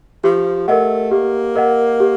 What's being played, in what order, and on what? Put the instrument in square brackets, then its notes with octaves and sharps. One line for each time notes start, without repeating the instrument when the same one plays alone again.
[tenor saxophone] F3 [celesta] G4
[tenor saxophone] A3 [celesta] A#4 D#5 F#5
[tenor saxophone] A#3 [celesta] G4
[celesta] A#4 D#5 F#5
G4